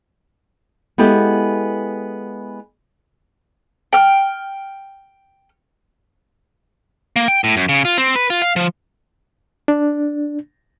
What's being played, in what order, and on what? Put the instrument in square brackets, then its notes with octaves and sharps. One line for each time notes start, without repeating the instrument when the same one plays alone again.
[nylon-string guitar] G#3 B3 E4 G4 A4
[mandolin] G5 F6
[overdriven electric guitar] A#3
G5
A2
F#2
C#3
F4
C4
B4
F4
F5
F3
[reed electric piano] D4